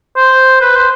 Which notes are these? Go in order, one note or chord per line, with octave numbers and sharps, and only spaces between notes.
C5
B4
C5